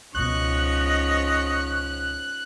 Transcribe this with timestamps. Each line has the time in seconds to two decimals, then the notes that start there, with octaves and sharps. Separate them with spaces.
0.15 C#2 G#2 B2 F3 C#4 D#5 C#6 F#6